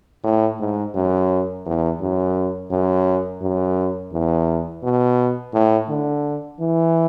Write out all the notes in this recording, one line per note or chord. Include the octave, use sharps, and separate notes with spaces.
A2
G#2
F#2
E2
F#2
F#2
F#2
E2
B2
A2
D3
E3